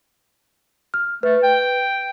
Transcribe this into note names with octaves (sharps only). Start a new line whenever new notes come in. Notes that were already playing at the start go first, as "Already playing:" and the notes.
F6
A3 B4
G5